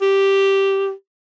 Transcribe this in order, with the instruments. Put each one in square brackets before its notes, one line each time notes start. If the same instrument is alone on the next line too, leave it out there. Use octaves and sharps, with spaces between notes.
[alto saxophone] G4